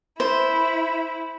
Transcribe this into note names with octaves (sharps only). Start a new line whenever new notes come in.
E4 C5